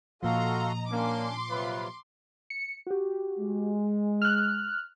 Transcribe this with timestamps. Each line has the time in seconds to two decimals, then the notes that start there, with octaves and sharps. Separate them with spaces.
0.23 A#2 F3 F#4 A4 D#5 F5 A#5 C6
0.90 A#3 C#4 D4 C6 D6
1.49 C3 F#3 F4 B4
2.50 C#7
2.87 F#4 G4
3.39 G#3
4.22 F6 F#6